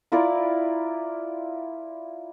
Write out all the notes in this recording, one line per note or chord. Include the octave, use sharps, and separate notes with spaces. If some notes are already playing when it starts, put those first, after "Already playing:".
E4 F4 A#4 D5